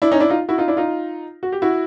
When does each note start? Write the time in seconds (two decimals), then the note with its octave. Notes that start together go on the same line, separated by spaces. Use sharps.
0.02 D4 E4
0.12 C#4 D#4
0.20 D4 E4
0.30 D#4 F4
0.49 E4 F#4
0.58 D#4 F4
0.68 D4 E4
0.77 D#4 F4
1.43 F#4
1.52 G4
1.62 E4 F#4